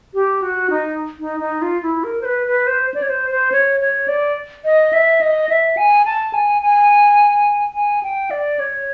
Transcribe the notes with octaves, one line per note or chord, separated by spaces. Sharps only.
G4
F#4
D#4
D#4
D#4
F4
E4
A#4
C5
B4
B4
C5
D5
C#5
C5
C5
C#5
C#5
D5
D#5
E5
D#5
E5
G#5
A5
G#5
G#5
G#5
G5
D5
C#5